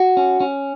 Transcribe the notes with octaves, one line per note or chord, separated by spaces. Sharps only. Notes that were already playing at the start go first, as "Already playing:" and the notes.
Already playing: F#4
C#4
C#4